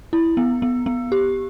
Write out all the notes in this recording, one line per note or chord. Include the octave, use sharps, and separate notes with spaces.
E4
B3
B3
B3
G4